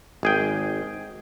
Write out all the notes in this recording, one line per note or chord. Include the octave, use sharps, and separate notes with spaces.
G#1 G#4 G5